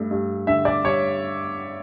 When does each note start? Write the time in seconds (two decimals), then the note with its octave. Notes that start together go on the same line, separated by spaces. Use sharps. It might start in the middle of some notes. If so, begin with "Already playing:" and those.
Already playing: G2 A3
0.11 G2
0.47 D3 E5
0.65 D5
0.84 G2 C#5